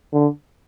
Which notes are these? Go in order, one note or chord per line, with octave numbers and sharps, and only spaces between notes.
D3